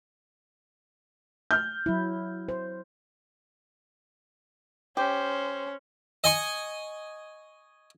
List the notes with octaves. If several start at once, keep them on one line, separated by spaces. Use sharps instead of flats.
F6 G6
F#3 E4
C5
C#4 G4 C5
D#5 G#5 C#6